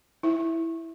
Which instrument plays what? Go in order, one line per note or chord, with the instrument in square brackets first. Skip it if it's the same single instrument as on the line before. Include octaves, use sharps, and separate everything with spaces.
[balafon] E4 E5